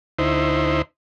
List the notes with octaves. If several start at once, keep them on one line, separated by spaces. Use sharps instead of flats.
D2 D#4 E4 C5